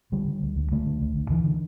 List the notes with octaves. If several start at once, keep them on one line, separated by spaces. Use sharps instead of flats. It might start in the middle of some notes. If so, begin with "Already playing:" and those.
D3 G3
D3
D2
D2
D3 A3
D3
D2
D2
D3 E3
D3